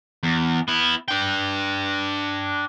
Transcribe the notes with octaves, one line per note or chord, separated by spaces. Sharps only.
E2
B3 E4
D4 G5